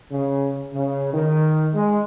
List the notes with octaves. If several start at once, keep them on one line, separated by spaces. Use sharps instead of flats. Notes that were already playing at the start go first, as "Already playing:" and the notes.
C#3
C#3
D#3
G#3